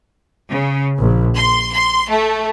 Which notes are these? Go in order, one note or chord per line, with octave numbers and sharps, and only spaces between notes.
C#3
A#1
C6
C6
A3